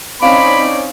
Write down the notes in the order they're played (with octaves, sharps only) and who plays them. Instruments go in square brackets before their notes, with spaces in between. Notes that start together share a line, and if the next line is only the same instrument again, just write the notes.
[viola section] C4 C#4 D#4 [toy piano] E4 F5 [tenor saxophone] D5 [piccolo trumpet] B5